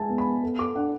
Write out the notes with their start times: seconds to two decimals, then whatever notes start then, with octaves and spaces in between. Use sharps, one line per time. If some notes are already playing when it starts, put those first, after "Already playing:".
Already playing: G#3 E5 G#5 A5
0.09 B3
0.18 B5
0.26 B3
0.43 A4
0.59 A4 D6
0.75 D4 F#5